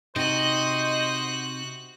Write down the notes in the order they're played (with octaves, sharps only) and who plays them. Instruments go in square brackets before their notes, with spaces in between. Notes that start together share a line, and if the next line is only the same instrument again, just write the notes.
[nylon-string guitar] C3 D#4 [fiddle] F#4 F#6 [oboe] C5 [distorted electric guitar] D#5